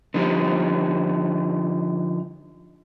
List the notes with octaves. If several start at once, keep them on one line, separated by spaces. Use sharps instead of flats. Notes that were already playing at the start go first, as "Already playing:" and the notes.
D3 F3 D#4 G4